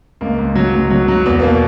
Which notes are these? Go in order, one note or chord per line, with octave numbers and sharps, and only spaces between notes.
C#2 A#3
C#2
F#3
C#2
F#3
F#3
E2 B3
B2 A#3